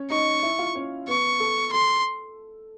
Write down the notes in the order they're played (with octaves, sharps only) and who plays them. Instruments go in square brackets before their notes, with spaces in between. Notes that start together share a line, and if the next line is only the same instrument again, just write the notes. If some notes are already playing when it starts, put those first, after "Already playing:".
Already playing: [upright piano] C#4 C#5
[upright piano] D#4 D#5 [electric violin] C#6
[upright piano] E4 E5
F4 F5
C#4 C#5
[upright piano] B3 B4 [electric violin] C#6
[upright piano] A4
[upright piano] A4 [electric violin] C6